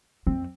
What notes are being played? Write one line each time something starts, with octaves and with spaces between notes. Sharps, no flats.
F2 C4